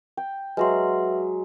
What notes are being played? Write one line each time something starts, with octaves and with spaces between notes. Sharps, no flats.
G5
F#3 G#3 B4 E5 C6